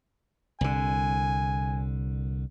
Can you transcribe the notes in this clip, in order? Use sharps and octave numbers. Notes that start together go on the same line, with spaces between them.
C2 D3 G#5